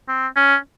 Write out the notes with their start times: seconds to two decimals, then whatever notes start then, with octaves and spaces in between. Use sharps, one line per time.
0.08 C4
0.36 C#4